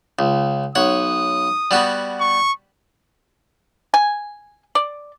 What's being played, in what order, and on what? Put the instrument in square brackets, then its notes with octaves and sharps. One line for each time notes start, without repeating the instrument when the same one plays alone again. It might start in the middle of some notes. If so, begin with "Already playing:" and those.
[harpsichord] C#2
[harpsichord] B1 C#5 F#5 [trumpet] D#6
[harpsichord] G3 B3 F#4
[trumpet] C#6
[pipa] G#5
D5